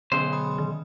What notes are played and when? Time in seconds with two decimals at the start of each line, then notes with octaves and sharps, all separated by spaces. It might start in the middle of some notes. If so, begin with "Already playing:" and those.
0.12 B1 D3 G#3 B3 C#4 C5
0.32 B5 D#6
0.58 D#3